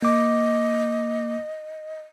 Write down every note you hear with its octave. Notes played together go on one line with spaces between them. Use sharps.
A#3 D#5 D6